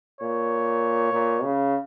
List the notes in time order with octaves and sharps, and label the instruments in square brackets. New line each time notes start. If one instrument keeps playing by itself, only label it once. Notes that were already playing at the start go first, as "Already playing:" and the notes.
[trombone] A#2 [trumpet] C#5
[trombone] A#2
C#3